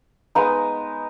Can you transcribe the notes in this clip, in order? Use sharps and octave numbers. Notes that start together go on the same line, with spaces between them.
G#3 B3 D#4